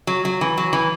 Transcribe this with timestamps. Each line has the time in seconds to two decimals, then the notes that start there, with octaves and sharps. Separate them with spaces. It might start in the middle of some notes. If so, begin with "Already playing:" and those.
0.07 F#3
0.25 F#3
0.41 E3
0.58 F#3
0.73 E3